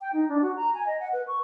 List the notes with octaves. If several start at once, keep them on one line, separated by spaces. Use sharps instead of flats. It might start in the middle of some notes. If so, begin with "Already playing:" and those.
G5
D#4
D4
F#4
A#5
G#5
D#5
F#5
B4
C#6